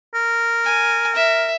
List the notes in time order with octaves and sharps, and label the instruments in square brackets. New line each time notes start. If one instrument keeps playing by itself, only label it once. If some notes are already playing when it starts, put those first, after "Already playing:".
[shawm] A#4
[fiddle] G#5
E5